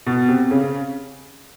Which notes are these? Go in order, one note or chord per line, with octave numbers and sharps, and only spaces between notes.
B2
C3
C#3